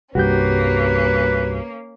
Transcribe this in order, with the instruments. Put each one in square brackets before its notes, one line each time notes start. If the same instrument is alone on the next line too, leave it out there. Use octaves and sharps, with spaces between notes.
[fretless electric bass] C2 G2 [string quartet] A#3 C#4 [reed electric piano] F#4 G4 G6 [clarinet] B4